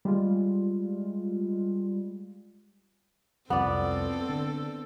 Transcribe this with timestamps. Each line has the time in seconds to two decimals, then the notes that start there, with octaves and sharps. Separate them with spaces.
0.05 G3 G#3 F4
3.50 C2 F2 F3 B3 C4 A4 D5
4.29 D3